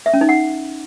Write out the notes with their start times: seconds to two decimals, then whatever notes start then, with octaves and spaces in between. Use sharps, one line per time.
0.06 E5
0.14 C#4
0.21 D#4
0.29 F#5